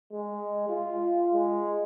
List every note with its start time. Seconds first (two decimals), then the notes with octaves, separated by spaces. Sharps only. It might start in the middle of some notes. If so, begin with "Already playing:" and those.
0.12 G#3
0.69 F4
1.33 G#3